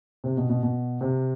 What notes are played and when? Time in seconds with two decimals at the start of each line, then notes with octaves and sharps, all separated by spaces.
0.24 C3
0.37 B2
0.50 B2
0.63 B2
1.01 C3